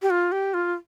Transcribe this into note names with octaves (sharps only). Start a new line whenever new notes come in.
G4
F4
G4
F4